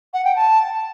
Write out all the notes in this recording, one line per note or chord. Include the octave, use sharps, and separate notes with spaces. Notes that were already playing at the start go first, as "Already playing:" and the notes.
F#5
G5
A5